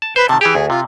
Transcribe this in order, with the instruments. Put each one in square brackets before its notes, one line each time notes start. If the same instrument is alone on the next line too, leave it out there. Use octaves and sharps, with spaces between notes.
[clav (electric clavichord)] A5
[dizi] B4 [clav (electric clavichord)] C5
[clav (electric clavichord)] C3 D#3 [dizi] A5
[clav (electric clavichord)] E3 G4 [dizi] G#4
[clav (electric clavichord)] D2
[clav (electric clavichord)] C3 [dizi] F4